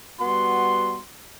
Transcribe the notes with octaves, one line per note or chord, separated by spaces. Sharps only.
G3 B3 F#4 C6